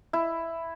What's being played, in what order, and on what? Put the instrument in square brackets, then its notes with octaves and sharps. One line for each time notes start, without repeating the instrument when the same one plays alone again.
[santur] E4